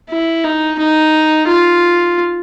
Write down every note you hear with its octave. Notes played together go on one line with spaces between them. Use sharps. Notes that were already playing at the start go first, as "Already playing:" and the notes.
E4
D#4
D#4
F4